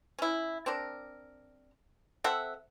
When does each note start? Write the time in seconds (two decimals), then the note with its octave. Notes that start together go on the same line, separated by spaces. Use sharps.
0.19 C#4 E4
0.66 C4 D4 A#4
2.24 C4 A4 E5 F#5